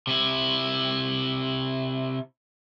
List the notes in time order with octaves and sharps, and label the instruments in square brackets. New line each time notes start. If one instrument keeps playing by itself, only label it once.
[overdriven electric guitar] C3 E4